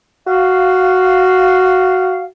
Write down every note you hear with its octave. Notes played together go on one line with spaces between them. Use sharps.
F#4 F5